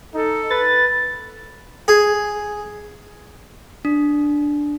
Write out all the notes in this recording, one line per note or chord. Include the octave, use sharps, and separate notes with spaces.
D#4 A4
B4 A6
G#4
D4